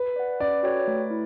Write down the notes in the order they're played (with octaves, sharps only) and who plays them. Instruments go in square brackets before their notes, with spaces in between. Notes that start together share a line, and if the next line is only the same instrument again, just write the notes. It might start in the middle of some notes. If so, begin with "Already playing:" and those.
Already playing: [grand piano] B4
[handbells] D5 F#5
[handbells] C#4 [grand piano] D5
[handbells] F#4 A4 C#5 G5
A3
E4